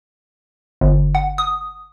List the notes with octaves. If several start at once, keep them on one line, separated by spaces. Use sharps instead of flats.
G1
F#5
D#6